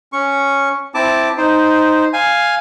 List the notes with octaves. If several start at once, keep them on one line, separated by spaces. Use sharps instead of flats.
C#4 C#6
C4 E4 A5 D6
D#4 C5
F5 G#5